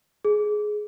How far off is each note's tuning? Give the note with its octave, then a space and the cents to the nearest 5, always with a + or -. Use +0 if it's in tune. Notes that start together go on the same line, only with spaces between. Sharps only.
G#4 +15